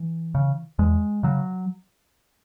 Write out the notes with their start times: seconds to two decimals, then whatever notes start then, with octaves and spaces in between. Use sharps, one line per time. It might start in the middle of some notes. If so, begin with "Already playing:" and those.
Already playing: E3
0.35 C#3
0.79 E2 G#3
1.23 C#3 F#3